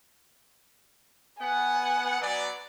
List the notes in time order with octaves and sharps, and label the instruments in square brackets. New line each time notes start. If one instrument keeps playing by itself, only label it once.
[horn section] B3 F#5 [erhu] G#5
[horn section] F#3 B3 D5